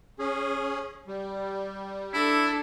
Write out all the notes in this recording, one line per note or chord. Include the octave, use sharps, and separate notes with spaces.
C#4 G#4
G3
D4 E4 A4